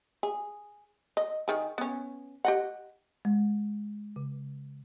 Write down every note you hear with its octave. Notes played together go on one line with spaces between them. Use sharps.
G#4
D#5
D#3 G#4
B3 C#4
G4 D#5 F#5
G#3
C#3